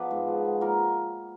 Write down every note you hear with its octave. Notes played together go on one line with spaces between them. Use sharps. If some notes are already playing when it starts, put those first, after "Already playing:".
Already playing: F3 B3 B4 D5 F5
G#2
F3
B3
A#2 A#4